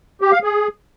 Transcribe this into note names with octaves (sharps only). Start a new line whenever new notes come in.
G4
F5
G#4